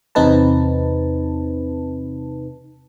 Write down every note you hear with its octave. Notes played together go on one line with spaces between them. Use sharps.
E2 C3 C4 D#4 B4 A5